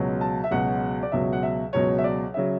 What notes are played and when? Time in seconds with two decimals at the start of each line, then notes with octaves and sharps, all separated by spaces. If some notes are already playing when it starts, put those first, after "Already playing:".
Already playing: C#2 B2 F#3
0.21 A5
0.44 E5
0.51 C#2 B2 F#3 F#5
1.03 D5
1.12 C#2 B2 F#3 E5
1.33 F#5
1.43 E5
1.73 C#2 B2 F#3 C#5
1.98 E5
2.04 D5
2.34 C#3 F#3 E5